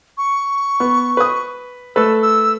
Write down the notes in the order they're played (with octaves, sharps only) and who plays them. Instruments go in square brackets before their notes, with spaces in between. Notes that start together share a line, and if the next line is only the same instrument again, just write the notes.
[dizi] C#6
[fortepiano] B3
B4 D#6
[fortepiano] A3 A4 B4 [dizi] E6
[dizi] E6